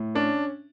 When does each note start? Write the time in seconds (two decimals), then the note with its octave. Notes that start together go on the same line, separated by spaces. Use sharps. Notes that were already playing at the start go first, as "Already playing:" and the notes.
Already playing: A2
0.15 C#4 D4